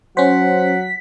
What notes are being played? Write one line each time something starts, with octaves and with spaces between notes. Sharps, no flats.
F#3 C#4 C5 F#5 B6